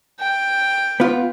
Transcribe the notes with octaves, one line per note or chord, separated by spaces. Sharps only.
G5
B3 F4